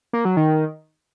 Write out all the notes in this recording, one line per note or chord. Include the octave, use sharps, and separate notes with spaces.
A#3
F#3
D#3